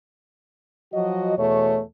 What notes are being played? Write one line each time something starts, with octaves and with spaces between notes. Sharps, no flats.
F3 F#3 F#4 D#5
E2 B2 A3 C#5